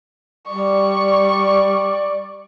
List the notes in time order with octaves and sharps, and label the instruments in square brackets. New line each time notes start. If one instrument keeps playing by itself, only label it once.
[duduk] G3 [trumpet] D5 [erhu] C#6